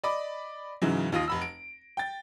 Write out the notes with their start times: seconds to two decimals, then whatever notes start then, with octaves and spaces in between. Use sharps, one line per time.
0.04 D5 D#5 B5 D6
0.82 G#2 C#3 E3 F#3
1.12 D#2 F4 D#6 A#6
1.28 F1 B5 E6
1.42 D7
1.97 G5 A6